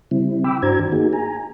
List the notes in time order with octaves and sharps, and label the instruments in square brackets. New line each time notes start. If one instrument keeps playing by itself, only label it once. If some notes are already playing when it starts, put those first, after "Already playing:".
[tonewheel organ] C#3 G3 C4 E4
G5 B5 D6 E6
G2 D4 F#4 C5 A#5 G#6
D#3
A#3 D#4 F#4 G#4
G#5 A#5